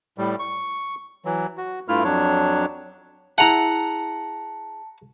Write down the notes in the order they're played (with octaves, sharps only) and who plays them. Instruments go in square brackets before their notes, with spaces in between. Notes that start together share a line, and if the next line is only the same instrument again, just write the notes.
[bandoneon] A2 G3
C#6
E3 F#3
F#4
G2 A3 E4 F4 F6
F2 F#3 D4 C#5
[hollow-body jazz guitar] E4 G#4 E5 [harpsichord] F#5 A#5 [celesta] A5